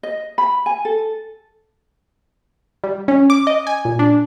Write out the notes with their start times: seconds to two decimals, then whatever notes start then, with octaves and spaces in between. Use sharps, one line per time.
0.03 D#5
0.38 B5
0.66 G#5
0.85 A4
2.84 G3
3.08 C#4
3.30 D6
3.47 D#5
3.67 G#5
3.85 A#2
3.99 D4